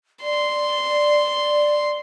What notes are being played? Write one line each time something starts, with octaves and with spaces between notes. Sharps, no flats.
D5 C6